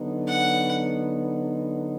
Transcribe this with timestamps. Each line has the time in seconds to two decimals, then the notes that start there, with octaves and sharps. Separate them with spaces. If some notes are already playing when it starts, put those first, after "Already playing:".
Already playing: D3 F#3 B3 D#4
0.28 F#5